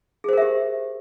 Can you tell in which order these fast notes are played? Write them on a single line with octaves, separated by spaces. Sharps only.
G#4 C5 A#4 E5 G4